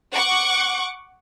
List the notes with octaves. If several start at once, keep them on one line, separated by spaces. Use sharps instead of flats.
F#5 C#6 D6